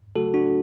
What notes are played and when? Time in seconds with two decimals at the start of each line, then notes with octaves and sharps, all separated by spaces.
0.16 C#3 F#3 A3 F#4 A4
0.34 D4 F#4